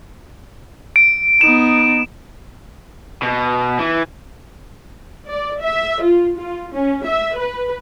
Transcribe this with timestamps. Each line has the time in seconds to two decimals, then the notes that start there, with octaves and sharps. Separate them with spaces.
0.96 D7
1.41 B3 D#4 E7
3.22 B2
3.79 E3
5.28 D5
5.61 E5
6.03 F4
6.37 F4
6.72 C#4
7.06 E5
7.37 B4